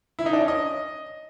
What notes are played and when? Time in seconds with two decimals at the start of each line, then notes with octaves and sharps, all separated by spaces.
0.19 E4
0.26 D#4
0.33 D4
0.41 C#4
0.48 D#5